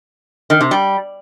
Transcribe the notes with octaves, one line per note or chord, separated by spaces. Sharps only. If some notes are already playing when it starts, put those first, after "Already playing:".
D#3
C3
G3